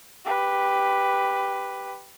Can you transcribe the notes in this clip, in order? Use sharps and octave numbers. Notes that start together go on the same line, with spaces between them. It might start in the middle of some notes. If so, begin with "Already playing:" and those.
G4 B4